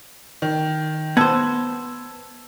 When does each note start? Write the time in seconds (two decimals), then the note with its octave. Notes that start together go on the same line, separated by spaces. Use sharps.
0.42 D#3
1.17 B3 C5 A5 E6 G#6